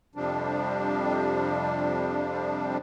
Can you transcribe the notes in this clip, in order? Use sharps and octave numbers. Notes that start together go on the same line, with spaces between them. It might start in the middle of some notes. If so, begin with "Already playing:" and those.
F2 C3 F3 G3 D4